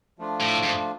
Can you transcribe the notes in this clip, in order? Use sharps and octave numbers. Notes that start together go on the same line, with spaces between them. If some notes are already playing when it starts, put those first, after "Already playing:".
F3 A3 D4 F4
A2
G#2